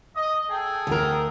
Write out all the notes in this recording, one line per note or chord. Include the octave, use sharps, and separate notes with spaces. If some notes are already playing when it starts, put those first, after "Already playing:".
D#5
G#4 A4 G5
D2 A#4